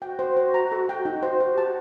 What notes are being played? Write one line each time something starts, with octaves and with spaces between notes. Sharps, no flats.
F#4 G5
C5
C5
A#5
A4
G5
D#4
C5
F#4 C5
G4 A5
F#4